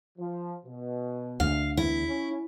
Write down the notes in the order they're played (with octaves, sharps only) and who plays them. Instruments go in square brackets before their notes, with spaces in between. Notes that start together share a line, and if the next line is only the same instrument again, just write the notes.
[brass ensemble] F3
B2
[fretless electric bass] D2 [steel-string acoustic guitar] F5
[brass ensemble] E2 [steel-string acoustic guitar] E4
[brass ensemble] C#4